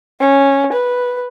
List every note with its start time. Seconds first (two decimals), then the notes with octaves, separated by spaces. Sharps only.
0.20 C#4
0.73 B4